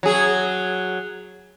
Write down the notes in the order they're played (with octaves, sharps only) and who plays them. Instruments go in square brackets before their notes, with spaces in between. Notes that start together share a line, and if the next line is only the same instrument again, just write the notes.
[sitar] F#3 G#4